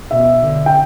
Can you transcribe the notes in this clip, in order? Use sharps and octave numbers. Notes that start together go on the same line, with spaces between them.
B2 E5
D3
G5